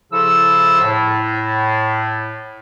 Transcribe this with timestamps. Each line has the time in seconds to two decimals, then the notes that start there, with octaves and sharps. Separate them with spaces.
0.12 C#3 F3 E4 A4 E6
0.80 A2